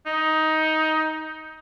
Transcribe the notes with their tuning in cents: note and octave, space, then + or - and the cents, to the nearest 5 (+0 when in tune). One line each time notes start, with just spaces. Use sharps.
D#4 +15